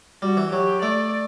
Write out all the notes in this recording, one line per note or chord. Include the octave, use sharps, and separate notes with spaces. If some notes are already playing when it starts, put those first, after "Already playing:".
G3 F#4
E3
F#3 G4
A3 D5